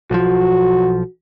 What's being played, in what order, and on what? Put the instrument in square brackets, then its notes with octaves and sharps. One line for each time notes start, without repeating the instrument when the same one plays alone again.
[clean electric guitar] B1 F3 [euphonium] F#4